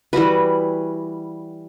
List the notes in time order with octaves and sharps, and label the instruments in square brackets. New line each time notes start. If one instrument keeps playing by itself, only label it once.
[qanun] E3 G3 F#4 B4